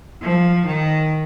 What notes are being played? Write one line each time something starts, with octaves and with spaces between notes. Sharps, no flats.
F3
D#3